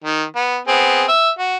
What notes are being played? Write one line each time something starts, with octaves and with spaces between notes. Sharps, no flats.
D#3
B3
B3 C4 G#4
E5
F#4